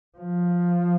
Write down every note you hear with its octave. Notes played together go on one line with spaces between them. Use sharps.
F3